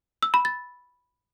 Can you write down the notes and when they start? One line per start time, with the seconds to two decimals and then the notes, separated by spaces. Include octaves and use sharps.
0.23 E6
0.34 B5
0.45 A6